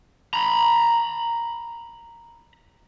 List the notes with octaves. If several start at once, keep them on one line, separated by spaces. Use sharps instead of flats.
A#5 B5